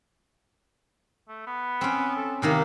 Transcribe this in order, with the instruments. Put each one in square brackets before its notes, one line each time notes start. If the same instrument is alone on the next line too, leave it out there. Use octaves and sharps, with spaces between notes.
[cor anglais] A3
B3
[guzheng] C4 C#4
[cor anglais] A4
[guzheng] C3 D#3 A#3 [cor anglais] D#4